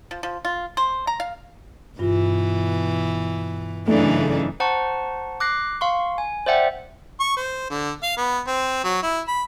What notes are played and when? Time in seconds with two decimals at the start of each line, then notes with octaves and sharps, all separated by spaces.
0.11 F3
0.23 F3
0.45 F4
0.77 C5
1.07 A#5
1.20 F5
1.99 G2 B2 E3 F4
3.88 F#2 C#3 E3 A3 D4 D#4
4.60 C5 F#5 A5 A#5 C#6
5.40 D6 F#6 A#6 C7
5.81 F5 C6 C#6
6.18 G#5
6.46 C5 D5 E5 F#5 G5
7.20 C#6
7.36 C5
7.70 D3
8.03 F5
8.17 B3
8.47 C4
8.84 F#3
9.03 E4
9.28 B5